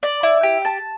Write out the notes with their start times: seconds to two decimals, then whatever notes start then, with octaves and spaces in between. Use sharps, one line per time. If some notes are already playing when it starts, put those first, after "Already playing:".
0.03 D5
0.23 E4
0.43 G4
0.65 A5